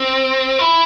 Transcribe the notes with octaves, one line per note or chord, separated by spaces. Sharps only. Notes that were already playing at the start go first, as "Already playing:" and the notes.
Already playing: C4
E4